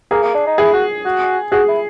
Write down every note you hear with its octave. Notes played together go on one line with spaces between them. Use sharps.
A#3 G#4
A#3
D4
D#4
E4 G#4
F#4
F#4
F#4 G#4
E4